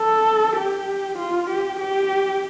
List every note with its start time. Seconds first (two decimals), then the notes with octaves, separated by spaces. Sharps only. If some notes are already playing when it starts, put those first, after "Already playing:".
Already playing: A4
0.56 G4
1.18 F4
1.50 G4
1.80 G4